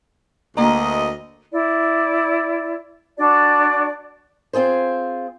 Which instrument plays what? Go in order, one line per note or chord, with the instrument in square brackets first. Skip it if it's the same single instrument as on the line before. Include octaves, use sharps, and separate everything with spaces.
[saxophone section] D2 D#5 [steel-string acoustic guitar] A#3 A#5
[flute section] E4 D5
D4 F#4 D5
[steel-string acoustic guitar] C4 F4 G#4 C5